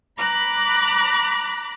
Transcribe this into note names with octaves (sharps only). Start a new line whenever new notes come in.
A#5 B5 D6 F#6